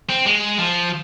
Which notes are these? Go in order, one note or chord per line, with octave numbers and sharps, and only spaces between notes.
C4
G#3
F3